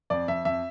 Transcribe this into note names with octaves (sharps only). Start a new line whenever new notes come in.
F2 D5
F2 E5
F2 E5